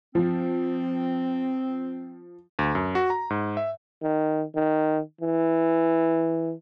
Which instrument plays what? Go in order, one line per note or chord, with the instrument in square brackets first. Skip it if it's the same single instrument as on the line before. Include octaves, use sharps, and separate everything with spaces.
[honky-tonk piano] F3 [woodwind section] C4
[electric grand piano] D2
F#2
F#4
A#5
G#2
E5
[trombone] D#3
D#3
E3